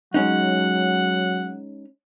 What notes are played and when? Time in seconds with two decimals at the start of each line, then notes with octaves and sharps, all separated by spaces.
0.14 F#3 G#3 C#4 D#4 F#5